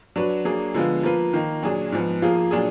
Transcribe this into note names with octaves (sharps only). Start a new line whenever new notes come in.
F#3 D4 F#4 B4
F#3 A#3 D4 G#4
D3 F3 G#3 B3 F4
F3 A#3 F4 B4
D#3 A#3 D#4
A#2 F#3 D4 G#4
G#2 F3 B3
F3 A#3 F4 G#4
A#2 F#3 D4 F4 G#4